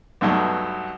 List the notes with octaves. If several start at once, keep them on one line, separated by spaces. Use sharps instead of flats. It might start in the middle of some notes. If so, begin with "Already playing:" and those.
B1 G2 B2 F#3 A3